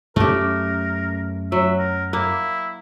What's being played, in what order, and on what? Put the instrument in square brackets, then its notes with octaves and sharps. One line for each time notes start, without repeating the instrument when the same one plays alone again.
[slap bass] F#2 C#4 [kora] A3 G4 [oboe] A#4
[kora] F#3 [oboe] E5
[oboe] A#4
[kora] A#3 [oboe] E4